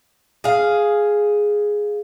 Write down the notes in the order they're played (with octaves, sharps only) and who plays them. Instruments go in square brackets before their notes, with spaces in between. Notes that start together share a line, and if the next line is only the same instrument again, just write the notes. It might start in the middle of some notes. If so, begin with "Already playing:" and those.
[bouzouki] G#4 F5